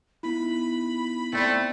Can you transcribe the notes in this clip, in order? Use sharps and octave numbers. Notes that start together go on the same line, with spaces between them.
B3 D#4 E4 B5
A3 C4 D5